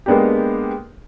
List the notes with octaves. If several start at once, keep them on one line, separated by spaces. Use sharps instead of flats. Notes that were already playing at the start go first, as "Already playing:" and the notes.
G#3 A#3 B3 D4 G4